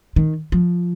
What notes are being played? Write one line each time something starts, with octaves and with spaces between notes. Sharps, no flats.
D#3
F3